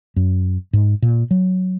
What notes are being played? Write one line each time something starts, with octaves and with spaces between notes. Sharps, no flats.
F#2
G#2
A#2
F#3